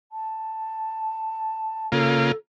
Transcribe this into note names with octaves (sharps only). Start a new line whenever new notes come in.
A5
C#3 A#3 F4 A4